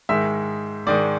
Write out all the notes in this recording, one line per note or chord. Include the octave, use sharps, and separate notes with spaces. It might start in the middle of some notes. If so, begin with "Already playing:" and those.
G#2 D#3 G#3 E5
G#2 D#3 G#3 D5